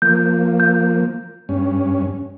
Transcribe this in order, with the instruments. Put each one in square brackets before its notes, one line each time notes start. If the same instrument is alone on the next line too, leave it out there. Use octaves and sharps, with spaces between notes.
[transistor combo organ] F3 A#3 [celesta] G6
[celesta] G6
[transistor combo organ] G2 C#4